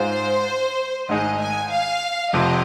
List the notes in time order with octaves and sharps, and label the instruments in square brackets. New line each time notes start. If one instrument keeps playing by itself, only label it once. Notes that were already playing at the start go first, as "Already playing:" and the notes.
Already playing: [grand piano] G#2 G#3 F4 [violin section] C5
[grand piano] G#1 G#2 G#3 D#4 G#4 [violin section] D#5
[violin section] G#5
F5
[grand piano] F1 F2 C3 F3 C4 [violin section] D#5